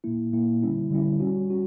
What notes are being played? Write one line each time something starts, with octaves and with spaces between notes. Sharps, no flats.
A#2 A#3 E4
A#2 A#3 E4
D3 G3 C#4 E4
D3 G3 C#4 E4
G3 C#4 F#4
C#4 F#4